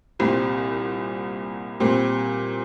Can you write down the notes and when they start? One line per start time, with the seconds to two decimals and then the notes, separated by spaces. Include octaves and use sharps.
0.19 C2 A#2 G3 C4
1.80 A#2 G3 C4